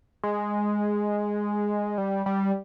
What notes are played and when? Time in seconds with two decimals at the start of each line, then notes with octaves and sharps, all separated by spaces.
0.24 G#3
1.98 G3
2.26 G3